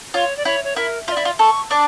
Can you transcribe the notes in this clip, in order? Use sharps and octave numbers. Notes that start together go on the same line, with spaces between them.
F4 C#5
D5
E4 C#5
C#5
E4 A#4
F4 E5
E4 D5
F4
A4 C#6
D4 D6